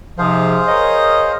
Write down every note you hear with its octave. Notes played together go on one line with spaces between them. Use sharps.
G#2 C3 F3 G#4 C5 F5
A#4 C#5 D#5